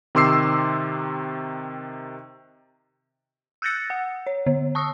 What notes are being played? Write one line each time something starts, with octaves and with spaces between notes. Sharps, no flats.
C3 D#3 C6 D6 E6 C7
E6 F#6 G6 A6 A#6 C#7
F#5
C#5
D3
A5 C#6 D#6 E6